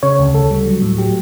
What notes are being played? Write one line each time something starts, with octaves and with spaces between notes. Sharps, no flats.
C#3 C#5
D2
D2 A4
G3
F#3
A2
F#3 G4